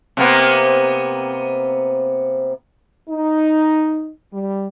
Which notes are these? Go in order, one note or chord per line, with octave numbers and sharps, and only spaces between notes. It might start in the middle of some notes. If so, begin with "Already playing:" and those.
C3 A#3 B3
D#4
G3